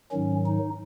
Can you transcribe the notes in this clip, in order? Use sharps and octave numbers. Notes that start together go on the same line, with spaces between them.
G#2 D#3 F#3 C#4
D#4